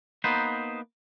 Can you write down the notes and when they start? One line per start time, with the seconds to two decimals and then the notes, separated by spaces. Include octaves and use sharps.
0.24 A#3 B3 D#4 B4 C5